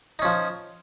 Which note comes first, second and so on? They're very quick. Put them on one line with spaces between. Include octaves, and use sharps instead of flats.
D#4 C#4 F3